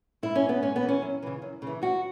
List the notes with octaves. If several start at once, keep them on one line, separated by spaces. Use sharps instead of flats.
G#2 E4
C#4
E3
B3
G#2 C#4
B3
E3
C#4
F#2
C#3 E3
F#2
C#3 E3
F#2 F#4